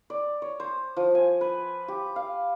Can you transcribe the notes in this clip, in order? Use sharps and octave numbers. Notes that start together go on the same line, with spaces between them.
D5
C#5
C5
F3
G#5
B4
G4
F5